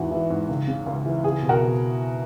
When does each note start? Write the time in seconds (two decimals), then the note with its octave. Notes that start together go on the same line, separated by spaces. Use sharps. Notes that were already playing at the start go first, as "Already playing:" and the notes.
Already playing: E2 G#2 E3 F#4
0.11 E3
0.30 G#2
0.49 C#2
0.68 C#3
0.86 C#2
1.06 E3
1.24 C#2 G#4
1.42 B2
1.49 F#4 A#4
1.62 B2